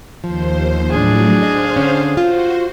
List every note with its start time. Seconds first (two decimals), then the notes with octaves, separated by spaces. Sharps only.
0.24 D#2 F3 C5
0.91 A2 F#3 D4 G#4
1.43 C5 D#5 F5
1.76 D3 C#4
2.17 F4 F#4 C5